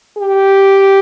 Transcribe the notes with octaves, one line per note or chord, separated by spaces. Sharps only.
G4